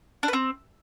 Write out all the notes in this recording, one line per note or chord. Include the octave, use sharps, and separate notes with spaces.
D4
B4
C4